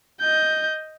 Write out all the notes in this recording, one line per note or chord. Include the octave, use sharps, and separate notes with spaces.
D#5 G6